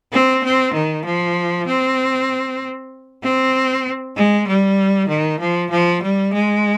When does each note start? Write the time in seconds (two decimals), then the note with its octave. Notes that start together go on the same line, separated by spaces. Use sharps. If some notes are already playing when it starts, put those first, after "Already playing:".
0.13 C4
0.44 C4
0.74 D#3
1.05 F3
1.67 C4
3.23 C4
4.16 G#3
4.47 G3
5.08 D#3
5.40 F3
5.71 F3
6.03 G3
6.33 G#3